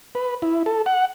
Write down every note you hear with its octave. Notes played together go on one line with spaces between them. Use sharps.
B4
E4
A4
F#5